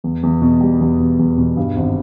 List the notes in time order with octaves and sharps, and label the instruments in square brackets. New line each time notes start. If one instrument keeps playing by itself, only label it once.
[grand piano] E2
E2
B2
G3
E2
B2
E2
B2
G2
G#1